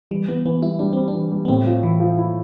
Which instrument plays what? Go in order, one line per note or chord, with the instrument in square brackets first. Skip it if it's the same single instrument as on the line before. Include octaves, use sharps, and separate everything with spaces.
[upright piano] E3 [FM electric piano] G3
[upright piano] E3 [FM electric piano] B3
[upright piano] E3 [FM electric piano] B3
[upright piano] G3 [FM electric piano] E4
[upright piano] G3 [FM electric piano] D4
[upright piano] G3 [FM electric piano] C4
[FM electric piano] D4
[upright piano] E3
G3
[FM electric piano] B3
[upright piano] A2 [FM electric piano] C4
[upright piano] F3
[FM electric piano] E3 [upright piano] E4
[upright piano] F3
E4